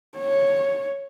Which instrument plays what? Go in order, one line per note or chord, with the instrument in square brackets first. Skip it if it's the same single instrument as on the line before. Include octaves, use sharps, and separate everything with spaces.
[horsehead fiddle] C#5